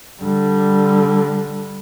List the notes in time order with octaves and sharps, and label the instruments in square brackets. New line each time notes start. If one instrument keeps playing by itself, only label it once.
[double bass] D3 G3